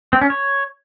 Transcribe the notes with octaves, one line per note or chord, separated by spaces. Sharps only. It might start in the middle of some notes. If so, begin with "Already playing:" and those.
C4
C#4
C#5